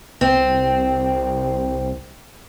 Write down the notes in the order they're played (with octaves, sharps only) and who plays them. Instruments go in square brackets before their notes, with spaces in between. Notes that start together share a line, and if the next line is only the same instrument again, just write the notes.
[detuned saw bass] C2 [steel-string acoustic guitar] C4